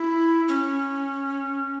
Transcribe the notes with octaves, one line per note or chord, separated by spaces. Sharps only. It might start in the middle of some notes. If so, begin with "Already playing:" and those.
Already playing: E4
C#4